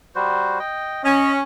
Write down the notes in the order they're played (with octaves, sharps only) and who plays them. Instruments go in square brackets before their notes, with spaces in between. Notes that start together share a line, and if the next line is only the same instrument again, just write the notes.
[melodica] G3 F#4 C5
D#5 G5
[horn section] C#4 [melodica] D#5